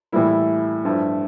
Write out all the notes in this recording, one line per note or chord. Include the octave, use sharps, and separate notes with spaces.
A2 E3 G3 A#3 E4
G2 F3 A3